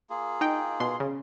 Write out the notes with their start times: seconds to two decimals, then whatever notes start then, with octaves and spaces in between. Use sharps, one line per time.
0.10 A#3 F4 G#4
0.41 D#4 G5
0.80 B2 C6
1.00 C#3